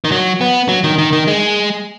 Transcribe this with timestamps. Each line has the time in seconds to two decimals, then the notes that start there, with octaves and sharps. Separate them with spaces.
0.04 D#3
0.12 F#3
0.41 B3
0.69 F#3
0.84 D#3
0.98 D#3
1.13 D#3
1.28 G#3